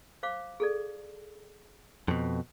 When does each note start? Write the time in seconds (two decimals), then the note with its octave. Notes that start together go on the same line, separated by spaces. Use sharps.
0.23 C5 F5 D6
0.60 G#4 A4 D5
2.08 F2 B2